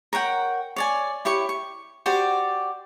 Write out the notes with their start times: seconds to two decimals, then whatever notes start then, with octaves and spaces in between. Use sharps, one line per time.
0.13 A#4 C#5 F#5 G5
0.76 C#5 D5 G#5
1.25 E4 G4 C#5 C#6
1.49 C#6
2.06 F#4 G4 C5 D5